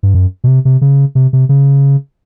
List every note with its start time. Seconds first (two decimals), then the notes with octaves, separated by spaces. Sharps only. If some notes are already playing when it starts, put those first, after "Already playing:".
0.03 G2
0.14 F#2
0.44 B2
0.47 C3
0.65 C3
0.81 C#3
1.15 C3
1.33 C3
1.49 C#3